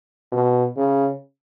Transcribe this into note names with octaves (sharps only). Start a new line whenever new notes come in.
B2
C#3